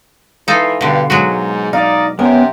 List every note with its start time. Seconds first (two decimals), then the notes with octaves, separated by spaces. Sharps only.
0.48 E3 D#4 F4 A4
0.81 G2 B2 D3
1.10 G#2 F#3 G#3 F#4
1.73 D#4 D5 F5
2.19 C3 B3 C#4 A#4 C5